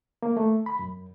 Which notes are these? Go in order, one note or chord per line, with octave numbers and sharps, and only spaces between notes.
A#3
A3
B5
F#2